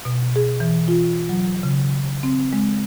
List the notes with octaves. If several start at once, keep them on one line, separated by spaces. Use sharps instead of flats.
B2
G#4
E3
F4
F#3
C#3
C4
G#3